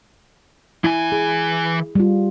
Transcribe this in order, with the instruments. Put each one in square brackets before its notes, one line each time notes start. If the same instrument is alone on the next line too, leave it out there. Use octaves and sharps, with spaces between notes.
[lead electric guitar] E3 G#5 [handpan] E4
[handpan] G#4
G3 F4